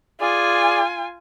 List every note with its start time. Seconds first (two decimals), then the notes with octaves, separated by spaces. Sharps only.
0.21 F4 G#4 D5 G#5